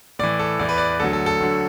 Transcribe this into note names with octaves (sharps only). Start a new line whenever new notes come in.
A2 E3 D5
A4
E2 E3 D5
B4
D5
D2 D3 F#3 A4
A4
A4
D2 D3 F#3